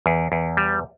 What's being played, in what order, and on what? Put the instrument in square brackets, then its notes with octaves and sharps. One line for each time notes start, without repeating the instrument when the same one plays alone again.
[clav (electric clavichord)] E2
E2
G3